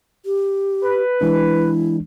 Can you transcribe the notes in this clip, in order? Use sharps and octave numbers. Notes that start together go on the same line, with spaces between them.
G4
B4
E3 G#3 D4 E4